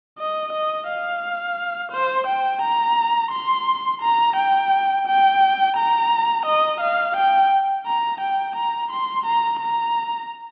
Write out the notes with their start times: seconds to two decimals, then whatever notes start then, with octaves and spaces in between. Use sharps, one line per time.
0.18 D#5
0.52 D#5
0.88 F5
1.92 C5
2.27 G5
2.62 A#5
3.32 C6
4.02 A#5
4.36 G5
5.07 G5
5.77 A#5
6.46 D#5
6.80 F5
7.16 G5
7.86 A#5
8.21 G5
8.56 A#5
8.91 C6
9.26 A#5
9.60 A#5